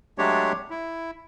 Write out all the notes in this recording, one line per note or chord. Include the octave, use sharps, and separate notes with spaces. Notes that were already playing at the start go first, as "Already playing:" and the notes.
F#3 G#3 A3 D4 G4 C#5
E4